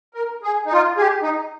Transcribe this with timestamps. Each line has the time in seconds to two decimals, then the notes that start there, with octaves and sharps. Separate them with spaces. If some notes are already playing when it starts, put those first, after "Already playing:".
0.14 A#4
0.43 G#4
0.67 D#4
0.73 F4
0.97 G#4
1.01 G4
1.23 D#4